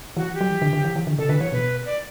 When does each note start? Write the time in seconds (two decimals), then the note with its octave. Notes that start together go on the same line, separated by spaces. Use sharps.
0.17 E3 F#4
0.34 G4
0.41 F#3
0.51 E3
0.62 D3
0.73 D3
0.85 E3
0.96 E3
1.07 D3
1.18 C#3 A4
1.29 D3 B4
1.41 E3 C#5
1.52 B2 B4
1.86 D5